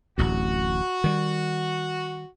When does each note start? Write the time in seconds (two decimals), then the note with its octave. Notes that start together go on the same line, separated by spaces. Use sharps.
0.18 D1 A1 D2 F#4
1.04 D#3 G3